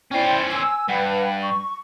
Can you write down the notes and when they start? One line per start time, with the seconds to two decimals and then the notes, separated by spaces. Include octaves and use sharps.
0.11 C#4 E4 C5 D5 G5
0.51 G#5 E6
0.88 G2 B4 F#5 G5
1.41 C#6